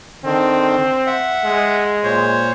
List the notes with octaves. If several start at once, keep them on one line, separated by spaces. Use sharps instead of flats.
D3 D#3 C4
E5 F#5
G#3
A#2 C5 C#5